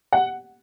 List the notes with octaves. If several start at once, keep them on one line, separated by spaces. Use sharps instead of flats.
F#5